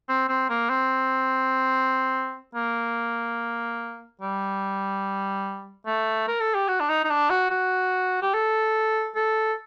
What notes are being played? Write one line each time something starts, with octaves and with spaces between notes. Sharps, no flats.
C4
C4
A#3
C4
A#3
G3
A3
A#4
A4
G4
F#4
D4
D#4
D#4
D4
F#4
F#4
G4
A4
A4